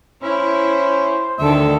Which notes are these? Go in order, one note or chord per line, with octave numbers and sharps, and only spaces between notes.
C#4 E4 C5
D2 D3 D#3 A4 E5